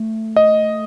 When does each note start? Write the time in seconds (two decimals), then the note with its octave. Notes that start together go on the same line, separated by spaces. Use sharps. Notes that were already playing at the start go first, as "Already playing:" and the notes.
Already playing: A3
0.36 D#5